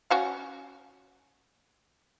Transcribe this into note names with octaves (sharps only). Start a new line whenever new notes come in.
C#4 F#4 F5